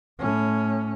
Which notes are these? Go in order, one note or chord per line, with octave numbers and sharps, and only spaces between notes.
A2 C#4